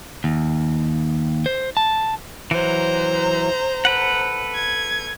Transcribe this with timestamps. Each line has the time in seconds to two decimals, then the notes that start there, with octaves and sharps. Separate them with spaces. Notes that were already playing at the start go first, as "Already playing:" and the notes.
0.24 D#2
1.46 C5
1.77 A5
2.51 E3 F#3 C5 A#5
3.85 A4 B4 F#5
4.55 G#6